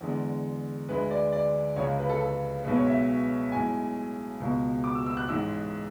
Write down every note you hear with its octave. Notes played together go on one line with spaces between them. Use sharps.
E2 D3 G#3
D2 D3 G#3 B4
D5
D5
C#2 C#3 G#3 C#5
B4
A4
A4
B1 B2 G#3 B4
C#5
E5
B1 A2 G#3 G#5
C#2 B2 G#3
D6
E6
E6
F#6
A1 G#2 G#3 E6